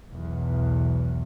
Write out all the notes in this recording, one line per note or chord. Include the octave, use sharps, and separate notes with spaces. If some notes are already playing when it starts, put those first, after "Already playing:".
B1 E2